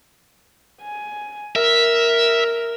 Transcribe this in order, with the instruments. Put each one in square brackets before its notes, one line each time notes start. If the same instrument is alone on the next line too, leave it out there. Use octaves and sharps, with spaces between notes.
[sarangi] G#5
[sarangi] A#4 [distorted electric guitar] E5